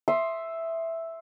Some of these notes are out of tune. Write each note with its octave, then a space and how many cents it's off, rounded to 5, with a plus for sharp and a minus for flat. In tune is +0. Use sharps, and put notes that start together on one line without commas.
E5 +0 C6 +10 D#6 +0